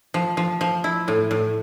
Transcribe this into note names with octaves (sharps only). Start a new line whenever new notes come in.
F3
F3
F3
E4
A2
A2